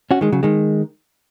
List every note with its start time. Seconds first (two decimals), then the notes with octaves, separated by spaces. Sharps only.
0.11 C#4 F#4
0.21 D#3 G#3
0.32 C#3 F#3
0.43 D#3 G#3